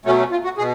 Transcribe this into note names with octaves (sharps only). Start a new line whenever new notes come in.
B2 F#3 A3 C#4
C#4
F4
F#4
B2 G#4